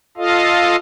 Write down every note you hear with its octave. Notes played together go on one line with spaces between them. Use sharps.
F4 A4 D#5 F5